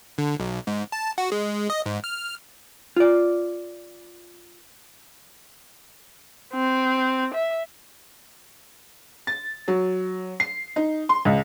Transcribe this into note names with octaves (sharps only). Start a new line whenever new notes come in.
D3
B1
G#2
A5
F#4
G#3
D#5
G#2
F6
F4 D5
C4
E5
A6
F#3
C7
D#4
C6
C#2